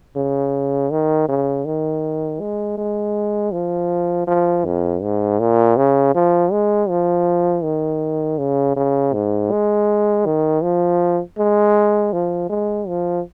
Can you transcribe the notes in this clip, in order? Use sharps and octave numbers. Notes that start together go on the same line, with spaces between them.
C#3
D#3
C#3
D#3
G#3
G#3
F3
F3
F2
G#2
A#2
C#3
F3
G#3
F3
D#3
C#3
C#3
G#2
G#3
D#3
F3
G#3
F3
G#3
F3